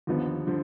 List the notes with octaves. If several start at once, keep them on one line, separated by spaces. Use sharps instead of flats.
D#2 D3 F3 B3 D#4
D3 F3